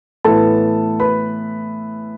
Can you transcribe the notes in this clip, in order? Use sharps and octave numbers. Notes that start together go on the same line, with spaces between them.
A2 E3 B3 A4 A5
B4 B5